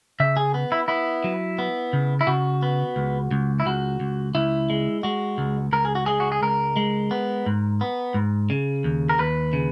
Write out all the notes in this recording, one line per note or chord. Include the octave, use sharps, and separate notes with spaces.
C#3 E5
G#4
B3
E4
B3 E4
F#3
B3
C#3
E4
C#3 F#4
B3
C#2
C#2
E4
C#2 F#4
C#2
C#2 E4
G#3
G#3 F#4
C#2
C#2 A#4
G#4
F#4
G#3 G#4
F#4
G#4
C#2 A#4
G#3
B3
G#2
B3
G#2
C#3
D#2
A#4
D#2 B4
C#3